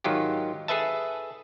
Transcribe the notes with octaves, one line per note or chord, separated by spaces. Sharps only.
G#2 D#3 F#3 F4 G4
G#4 A4 B4 E5 A5